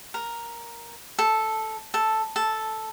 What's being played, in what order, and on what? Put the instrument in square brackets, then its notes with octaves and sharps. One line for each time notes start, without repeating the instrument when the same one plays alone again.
[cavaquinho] A#4
A4
A4
A4